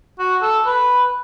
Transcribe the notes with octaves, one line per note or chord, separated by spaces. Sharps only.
F#4
A4
B4